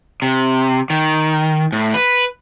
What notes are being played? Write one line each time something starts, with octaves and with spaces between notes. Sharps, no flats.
C3
D#3
A2
B4